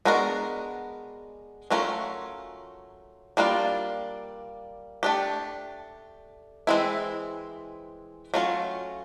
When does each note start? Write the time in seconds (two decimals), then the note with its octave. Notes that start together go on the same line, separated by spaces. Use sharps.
0.05 G#3 B3 D4 F#4 A#4
1.70 F#3 A3 C#4 F4 A#4
3.37 G3 A#3 D4 F4
5.03 A3 D4 G4
6.67 E3 G#3 C4 E4
8.34 F#3 A3 C#4 F4